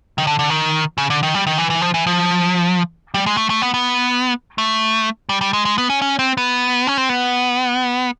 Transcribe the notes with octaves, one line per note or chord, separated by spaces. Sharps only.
D#3
D3
D3
D#3
C#3
D3
D#3
G3
D#3
E3
E3
F3
E3
F3
G3
G#3
A3
A3
B3
B3
A3
G3
G3
G#3
G#3
B3
C#4
C#4
C4
B3
C#4
C4
B3